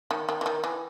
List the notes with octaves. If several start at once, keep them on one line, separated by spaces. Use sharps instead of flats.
D#3
D#3
E3
D#3
E3